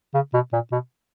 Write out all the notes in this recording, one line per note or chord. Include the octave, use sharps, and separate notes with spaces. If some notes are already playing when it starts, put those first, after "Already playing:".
C#3
B2
A#2
B2